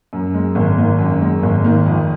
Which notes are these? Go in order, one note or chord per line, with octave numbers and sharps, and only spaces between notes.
F#2
G#3
G#1
D#3
F#2
G#3
G#1
D#3
F2